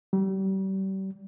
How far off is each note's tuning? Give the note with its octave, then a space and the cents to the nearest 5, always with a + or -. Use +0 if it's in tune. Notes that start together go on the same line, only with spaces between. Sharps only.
G3 -35